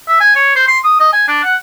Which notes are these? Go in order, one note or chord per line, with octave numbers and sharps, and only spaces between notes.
E5
G#5
C#5
C5
C6
D#6
D#5
G#5
D4
F#5